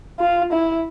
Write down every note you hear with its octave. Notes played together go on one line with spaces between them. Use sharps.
F4
E4